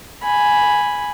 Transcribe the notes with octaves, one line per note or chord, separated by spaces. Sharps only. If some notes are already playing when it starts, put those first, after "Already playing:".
G#5 B5